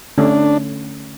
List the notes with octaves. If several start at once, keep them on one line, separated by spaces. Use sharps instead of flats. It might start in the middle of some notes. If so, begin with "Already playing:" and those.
D3 A3 C#4 D4